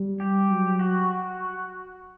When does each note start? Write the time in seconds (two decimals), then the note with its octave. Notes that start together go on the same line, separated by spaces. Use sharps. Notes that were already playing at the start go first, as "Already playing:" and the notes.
Already playing: G3
0.20 G4
0.50 F#3
0.79 F#4